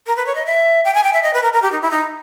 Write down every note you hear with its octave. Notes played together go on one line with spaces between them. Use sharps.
A#4
B4
C#5
D#5
E5
G5
G#5
G5
E5
D#5
B4
A#4
A#4
G4
D#4
E4
D#4